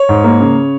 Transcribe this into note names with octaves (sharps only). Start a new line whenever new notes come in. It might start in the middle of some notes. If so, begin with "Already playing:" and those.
Already playing: C#5
G#2
A#3
C#3